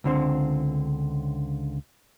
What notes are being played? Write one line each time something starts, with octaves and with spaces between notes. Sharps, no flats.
C#2 D3 C4